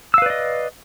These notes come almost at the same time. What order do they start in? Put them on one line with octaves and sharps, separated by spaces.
E6 F5 B4 D5 D#5